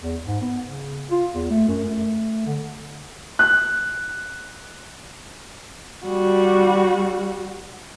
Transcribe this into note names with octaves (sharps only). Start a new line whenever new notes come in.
E2
G#2
B3
C#3
F4
E2
A3
F#2
A3
D3
F#6
G3 F#4